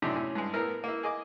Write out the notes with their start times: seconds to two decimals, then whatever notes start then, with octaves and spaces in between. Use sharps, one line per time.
0.02 F#2 A2 C3 D4 D#4
0.16 A2 C#4
0.35 G2 G#3
0.54 A2 B3 E4 A#4 F6
0.84 A#3 E4
1.03 G#4 D#5 D6